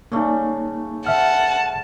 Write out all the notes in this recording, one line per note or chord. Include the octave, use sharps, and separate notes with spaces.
C#3 G3 A3 A#3 D#4
E5 F#5 A5 F6